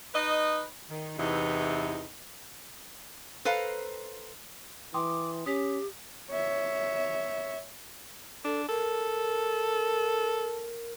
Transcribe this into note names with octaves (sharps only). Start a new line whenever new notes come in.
D#4 B4 D#5
D#3
E2 C3 E3 D#4
A4 B4 C5 F5 A#5
E3 G5 C6 D6 D#6
C#4 G4 D#6 B6
C#5 E5
D4 A4
A4 A#4